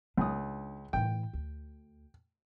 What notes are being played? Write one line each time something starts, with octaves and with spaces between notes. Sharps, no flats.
C#2 D4 D#6
A2 E3 G5
D2